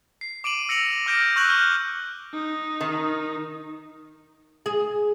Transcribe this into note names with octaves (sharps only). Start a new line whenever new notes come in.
C7
D6 D7 D#7 F#7
E6 A#6 C#7 D7 F7 F#7
D6 F6 G6 A#6 D7
C#6 E6 F#6 G6 F#7
F6
D#4
D#3
G#4